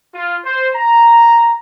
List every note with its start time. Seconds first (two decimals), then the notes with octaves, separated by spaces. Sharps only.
0.14 F4
0.45 C5
0.75 A#5